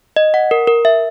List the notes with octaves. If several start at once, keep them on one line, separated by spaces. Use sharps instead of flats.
D#5
F#5
A#4
A#4
E5